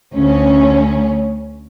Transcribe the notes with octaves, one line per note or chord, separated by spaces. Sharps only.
D2 C#4